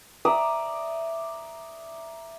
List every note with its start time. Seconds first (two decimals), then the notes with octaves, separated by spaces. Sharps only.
0.25 D5 E5 A#5 D#6